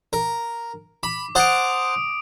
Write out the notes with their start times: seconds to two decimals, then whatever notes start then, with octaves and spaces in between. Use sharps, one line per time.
0.13 A#4
1.03 B5 D6
1.35 C5 F#5 A5 D#6 D7